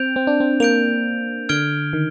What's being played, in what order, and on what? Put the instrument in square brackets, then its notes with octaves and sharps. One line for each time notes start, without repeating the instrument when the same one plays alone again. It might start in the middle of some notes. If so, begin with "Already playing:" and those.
Already playing: [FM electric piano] C4 [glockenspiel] G6 D7 F7
[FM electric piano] C4
D4
C4
[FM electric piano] A#3 [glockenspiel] G6 D7 F7
[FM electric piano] D3 [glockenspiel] F6 G#6 D7 G7
[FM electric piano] D#3